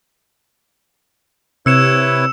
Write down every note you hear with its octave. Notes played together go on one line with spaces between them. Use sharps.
C3 E4 B4 C#5 E6 C#7 E7